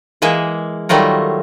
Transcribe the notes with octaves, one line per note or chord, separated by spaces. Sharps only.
E3 G#3 A#3 G#4 E5
D#3 F#3 G3 A3 F4 A#4